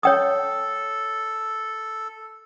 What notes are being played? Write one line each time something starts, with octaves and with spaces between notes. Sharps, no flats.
A4 C#5 G5 D#6